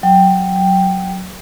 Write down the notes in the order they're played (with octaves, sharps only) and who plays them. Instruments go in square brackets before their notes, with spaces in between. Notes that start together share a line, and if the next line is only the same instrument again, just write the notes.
[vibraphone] F#3 G5